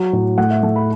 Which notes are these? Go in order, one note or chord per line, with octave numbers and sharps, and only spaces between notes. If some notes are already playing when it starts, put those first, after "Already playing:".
Already playing: F#3
A2
A3 F#5
E5
A3
B5